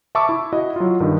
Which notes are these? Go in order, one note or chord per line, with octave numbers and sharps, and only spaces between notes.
E5 A5 B5 C#6 D6 E6
E4
E4 F#4 D#5
F#3 F4
G2 D#3